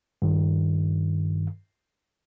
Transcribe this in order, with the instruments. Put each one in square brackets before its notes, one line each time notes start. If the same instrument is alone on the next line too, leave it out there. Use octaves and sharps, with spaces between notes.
[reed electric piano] G2 D#3